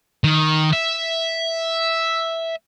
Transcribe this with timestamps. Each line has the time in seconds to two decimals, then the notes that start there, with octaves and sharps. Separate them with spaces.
0.24 D#3
0.73 E5